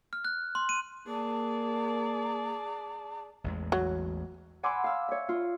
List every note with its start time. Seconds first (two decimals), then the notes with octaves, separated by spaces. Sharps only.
0.13 F6
0.25 F#6
0.55 C6
0.69 D#7
1.07 A#3 G#4 D5 A5
3.44 A1 E2 G#3
3.72 F#3
4.63 F#5 G#5 B5 C6 D6 E6
4.84 F5 E6 F6
5.08 C#5 E5
5.29 F4